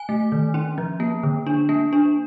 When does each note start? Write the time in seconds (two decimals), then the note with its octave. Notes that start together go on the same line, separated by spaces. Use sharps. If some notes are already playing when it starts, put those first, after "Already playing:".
Already playing: G#5
0.09 A3
0.32 D#3
0.54 C#4
0.78 F3
1.00 A#3
1.23 D3
1.47 D4
1.69 A#3
1.93 D4